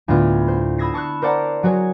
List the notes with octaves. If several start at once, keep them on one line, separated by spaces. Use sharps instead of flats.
D2 A2 B3 F4
C5
B5 D#6 E6 G#6 A#6 C7
A5 C#6 E6 F#6
A#4 C5 D5 F#5 A5 A#5
F#3 F#4 G#4 C#5